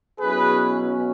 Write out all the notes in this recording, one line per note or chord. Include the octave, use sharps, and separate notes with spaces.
B2 F#3 C#4 E4 G#4 B4